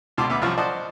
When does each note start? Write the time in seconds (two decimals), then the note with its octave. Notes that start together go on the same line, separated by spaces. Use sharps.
0.18 C#2 B2 A5 C6 D6
0.30 D2 B3 E5 D6
0.41 C2 F#2 F3 F4 C#6
0.58 C5 D5 D#5 F#5 A5